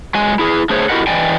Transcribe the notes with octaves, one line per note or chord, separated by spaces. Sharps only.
F#3 G#3 G#5
E4 G#4
D3 A3 G#4 C5 C#5
E4 F#4 G4 A#4 D#5 F#5
E3 D5 D#5 G5 G#5